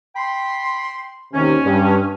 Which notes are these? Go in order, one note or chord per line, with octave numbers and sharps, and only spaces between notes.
G5 B5 C6
D#2 C3 C#4
G2